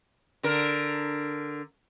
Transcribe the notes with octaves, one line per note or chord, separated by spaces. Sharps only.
D3 A#4